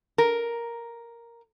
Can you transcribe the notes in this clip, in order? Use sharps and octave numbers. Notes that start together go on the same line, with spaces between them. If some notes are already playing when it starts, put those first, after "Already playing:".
A#4